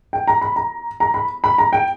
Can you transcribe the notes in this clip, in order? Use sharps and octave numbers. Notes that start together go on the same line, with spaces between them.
G5
A#5
B5
A#5
A#5
B5
B5
A#5
G5